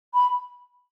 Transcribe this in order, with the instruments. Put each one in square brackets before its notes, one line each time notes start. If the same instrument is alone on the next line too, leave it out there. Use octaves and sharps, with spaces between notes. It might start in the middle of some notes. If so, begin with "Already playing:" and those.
[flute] B5